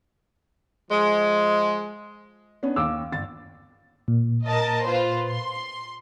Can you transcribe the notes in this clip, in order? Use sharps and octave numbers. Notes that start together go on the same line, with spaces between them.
F3 G#3
B3 C#4 D4
D#2 F5 D6 E6
G1 A6
A#2
A#4 D#5 A5
F4 B4 C5
C6